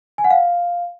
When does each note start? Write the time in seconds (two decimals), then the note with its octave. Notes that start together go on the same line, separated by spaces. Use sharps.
0.18 G#5
0.24 F#5
0.31 F5